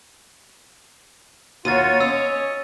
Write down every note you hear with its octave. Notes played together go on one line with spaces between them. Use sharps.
D#2 F4 F#4 C#5 A6 D#7
C#4 D#5 E6